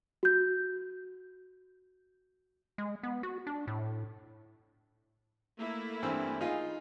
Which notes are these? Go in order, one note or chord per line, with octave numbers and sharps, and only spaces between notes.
F#4 G6
G#3
B3
F#4
D4
A2
A3 A#3 E4
G2 E3 C4
D#4 F4 G#4